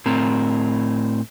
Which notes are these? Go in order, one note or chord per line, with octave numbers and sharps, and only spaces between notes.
A2 C4 A#4